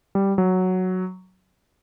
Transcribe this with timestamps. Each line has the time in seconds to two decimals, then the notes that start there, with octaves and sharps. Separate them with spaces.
0.15 G3
0.38 F#3